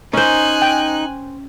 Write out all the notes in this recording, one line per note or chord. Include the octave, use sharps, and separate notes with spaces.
C#4 D#4 C5 G#5 F#6
G5